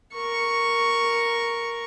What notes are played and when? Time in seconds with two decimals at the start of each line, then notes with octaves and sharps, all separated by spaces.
0.15 A#4 C#6